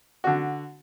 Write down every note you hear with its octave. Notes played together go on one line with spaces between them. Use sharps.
D3 F#4